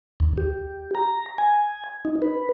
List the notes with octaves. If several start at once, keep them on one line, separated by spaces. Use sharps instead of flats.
D#2
G4
A#5
G#5
D#4
B4